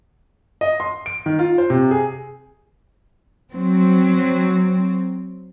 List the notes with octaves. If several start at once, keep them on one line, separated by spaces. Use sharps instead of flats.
D#5
C6
D7
D#3
F4
C5
C3
G#4
F#3 C4